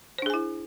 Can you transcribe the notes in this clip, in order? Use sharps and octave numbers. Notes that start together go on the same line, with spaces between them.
D4 E4 G#4 C5 G#5